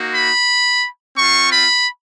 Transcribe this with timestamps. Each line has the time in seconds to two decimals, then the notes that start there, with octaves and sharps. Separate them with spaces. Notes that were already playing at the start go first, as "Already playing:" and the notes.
Already playing: A#3 D#4 F#4
0.14 B5
1.17 C4 F4 C#6
1.51 B5